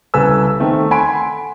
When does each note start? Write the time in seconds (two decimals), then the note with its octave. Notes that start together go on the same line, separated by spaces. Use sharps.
0.14 C2 C#3 A4 B4 G#5 E6
0.60 D#3 A3 C4
0.91 F#5 G#5 B5 C6 D7